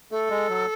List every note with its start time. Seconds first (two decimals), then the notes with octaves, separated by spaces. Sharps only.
0.11 A3 A4
0.30 G#3
0.49 F#3